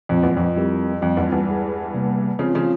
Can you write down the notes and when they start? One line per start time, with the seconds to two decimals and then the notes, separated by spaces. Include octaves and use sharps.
0.09 F2 A#2 F3 G#3 C4
0.23 E2
0.37 F2
0.56 G3 C4 E4 G4 A#4
1.01 F2 G3 C4 F4
1.17 E2 G2
1.32 E2 G2
1.47 G#3 E4 G#4
1.94 C3 G3 A#3
2.39 C#3 F3 G#3 C4 F4
2.55 C#3 F3